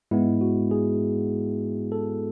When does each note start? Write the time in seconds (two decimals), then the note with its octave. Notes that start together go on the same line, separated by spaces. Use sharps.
0.11 G#2 G#3 B3 E4
0.41 F#4
0.71 G#4
1.92 A4